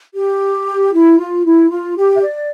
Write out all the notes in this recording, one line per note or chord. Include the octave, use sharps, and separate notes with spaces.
G4
E4
F4
E4
F4
G4
E5
D5